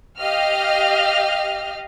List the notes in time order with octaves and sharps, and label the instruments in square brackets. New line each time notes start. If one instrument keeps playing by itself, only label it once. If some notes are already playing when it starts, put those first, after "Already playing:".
[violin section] G4 D#5 F5 F6